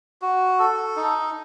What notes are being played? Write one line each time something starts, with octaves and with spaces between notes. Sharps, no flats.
F#4
A4
D#4